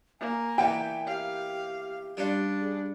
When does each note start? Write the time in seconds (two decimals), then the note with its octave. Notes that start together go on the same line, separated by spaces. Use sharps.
0.20 A#3 G#5
0.58 A#2 E3 B3 G5
1.07 G4 F5
2.17 G3 C#4 D4 F4
2.60 G#4